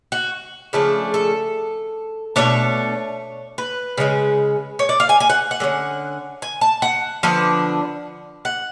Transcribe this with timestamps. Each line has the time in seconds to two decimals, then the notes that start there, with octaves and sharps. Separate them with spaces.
0.12 F#4
0.73 C#3 F3 A3 D4
1.14 A4
2.36 B2 A3 D4 C#5
3.58 B4
3.98 C#3 G#3 C#4
4.79 C#5
4.89 D5
5.00 F5
5.09 G#5
5.20 G#5
5.30 F#5
5.51 F#5
5.60 D3 G#3 C#4
6.42 G#5
6.61 A5
6.82 F#5
7.23 D3 F3 B3 D4
8.45 F#5